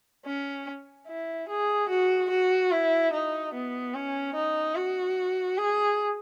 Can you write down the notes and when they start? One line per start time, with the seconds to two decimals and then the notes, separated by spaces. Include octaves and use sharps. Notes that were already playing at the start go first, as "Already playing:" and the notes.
0.25 C#4
1.08 E4
1.49 G#4
1.89 F#4
2.30 F#4
2.72 E4
3.13 D#4
3.54 B3
3.94 C#4
4.35 D#4
4.76 F#4
5.57 G#4